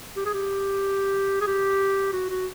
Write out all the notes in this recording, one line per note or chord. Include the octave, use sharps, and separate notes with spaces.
G4
G#4
G4
G#4
G4
F#4
F#4